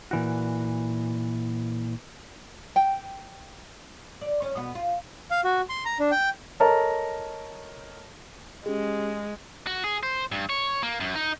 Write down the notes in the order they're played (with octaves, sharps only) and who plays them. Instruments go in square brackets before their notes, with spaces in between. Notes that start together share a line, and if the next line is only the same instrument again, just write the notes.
[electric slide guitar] A#2 E3 F#4
[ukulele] G5
[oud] D5
C#4
B2 B3
F4
[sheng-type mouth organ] F5
F#4
C6
A#5
D4
G5
[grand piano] A4 A#4 C#5 D#5 A5 A#5
[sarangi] G#3 [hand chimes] C#4 G4 G#4
[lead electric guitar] F#4
G#4
C5
G2
C#5
A#3
F#2
D#4